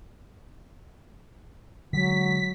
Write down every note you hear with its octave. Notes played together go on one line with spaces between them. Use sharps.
D3 F#3 G#3 B6